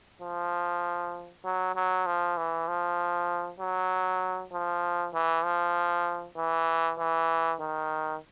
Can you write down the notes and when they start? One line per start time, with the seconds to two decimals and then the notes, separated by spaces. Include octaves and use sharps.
0.22 F3
1.45 F#3
1.76 F#3
2.06 F3
2.37 E3
2.68 F3
3.60 F#3
4.52 F3
5.14 E3
5.44 F3
6.37 E3
6.99 E3
7.61 D#3